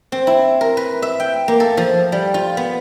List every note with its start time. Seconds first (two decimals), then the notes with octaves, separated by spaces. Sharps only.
0.12 C4
0.27 E4
0.61 A#4
0.77 B4
1.02 E5
1.20 G5
1.48 A#3
1.60 A4
1.77 F3
2.12 G3
2.34 F4
2.57 B3